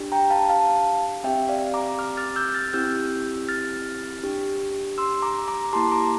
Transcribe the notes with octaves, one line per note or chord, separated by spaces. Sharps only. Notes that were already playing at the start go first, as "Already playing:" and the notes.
Already playing: D4 G4
G5 A#5
F5 A5
F5 A5
C4 G4 E5 G5
D5 F5
A#5 D6
D6 F6
F6 A6
E6 G6
F6 A6
C4 E4 G4 E6 G6
F6 A6
D4 G4
C6 E6
A#5 D6
A#5 D6
A#3 E4 G4 A5 C6
A#5 D6